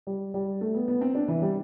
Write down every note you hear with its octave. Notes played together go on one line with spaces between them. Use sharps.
G3
G3
A3
B3
B3
C4
D4
E3
G3